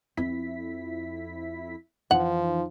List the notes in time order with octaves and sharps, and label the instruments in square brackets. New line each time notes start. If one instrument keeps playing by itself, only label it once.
[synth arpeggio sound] F2 E4 B6 [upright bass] C4
[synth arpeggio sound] F2 D#4 [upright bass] E3 [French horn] F3 [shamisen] F#5